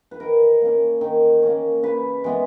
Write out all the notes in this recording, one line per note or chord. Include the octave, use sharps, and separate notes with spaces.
B4
D#3 A#4
A#3 C#4
D#3
A#3 C#4
C#3 B4
E3 G#3 B3